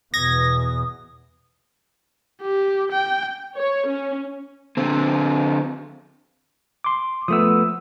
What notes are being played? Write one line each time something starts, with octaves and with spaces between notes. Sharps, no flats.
E2 B2 D#6 G#6 A#6
G4
G5
C#5
C#4
D3 C4
C6 D6
F3 A3 B3 D#6 E6